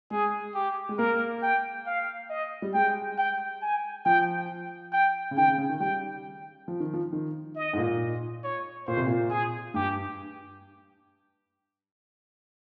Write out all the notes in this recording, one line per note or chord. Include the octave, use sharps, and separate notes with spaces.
G#3 G#4
G4
G#3
A#3 A#4
G5
F5
D#5
G3
G#3 G5
G5
G#5
F3 G5
G5
C#3
D#3 G5
C#3
C#3
D#3
G3 G5
F3
D#3
F3
D#3
D#5
G#2
A#2
C#5
A#2 C5
C3
A#2
G#4
G2 G4